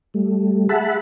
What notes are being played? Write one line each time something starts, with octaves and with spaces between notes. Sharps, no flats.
G3 A3
G#4 E5 F#5 A5 B5